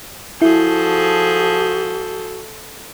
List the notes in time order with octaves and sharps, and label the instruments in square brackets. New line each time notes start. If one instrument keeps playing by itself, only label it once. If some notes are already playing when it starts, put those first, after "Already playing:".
[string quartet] F3 G#4 G6 [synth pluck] E4 [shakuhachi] F#4 [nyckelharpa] A4